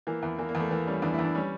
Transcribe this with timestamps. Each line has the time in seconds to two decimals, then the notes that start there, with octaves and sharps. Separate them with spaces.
0.07 E3 A#3
0.23 E2
0.39 E3 A#3
0.49 A#3
0.55 E2
0.60 A3
0.71 E3 A#3
0.87 G3 C#4
1.02 E2 D4
1.13 E4
1.19 E2
1.24 D4
1.35 G3 C#4